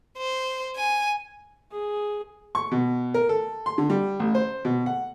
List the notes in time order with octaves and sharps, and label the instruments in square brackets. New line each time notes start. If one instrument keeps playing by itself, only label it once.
[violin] C5
G#5
[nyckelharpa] G#4
[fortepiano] C#6
B2
A#4
A4
C6
D3
G3
A1
C5
B2
F#5